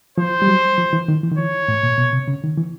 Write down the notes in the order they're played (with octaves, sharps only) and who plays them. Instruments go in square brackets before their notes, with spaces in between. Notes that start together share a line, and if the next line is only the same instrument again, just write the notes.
[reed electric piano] F3 [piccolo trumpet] C5
[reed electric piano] G3
F#3
F3
E3
D#3
E3
D#3
[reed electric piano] E3 [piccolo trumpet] C#5
[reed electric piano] A2
A#2
B2
C3
C#3
D#3
E3